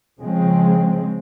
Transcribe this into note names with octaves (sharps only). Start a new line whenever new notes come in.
C#3 F3 G#3 C4